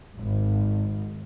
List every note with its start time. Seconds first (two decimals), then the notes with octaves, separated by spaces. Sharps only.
0.18 G#1